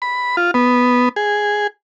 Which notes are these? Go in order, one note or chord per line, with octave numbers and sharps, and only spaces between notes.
B5
F4
B3
G#4